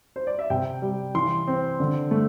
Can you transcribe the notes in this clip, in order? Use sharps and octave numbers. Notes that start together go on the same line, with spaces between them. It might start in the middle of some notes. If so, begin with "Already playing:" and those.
C5
D5
E5
C3 G5
G3
E3 C6
C4
D3
A3